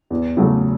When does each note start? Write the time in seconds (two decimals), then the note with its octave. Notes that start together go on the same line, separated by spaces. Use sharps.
0.10 E2
0.37 C#3 F#3 A3